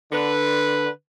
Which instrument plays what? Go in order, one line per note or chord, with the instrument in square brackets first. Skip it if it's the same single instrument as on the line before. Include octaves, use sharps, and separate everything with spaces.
[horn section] D3 B4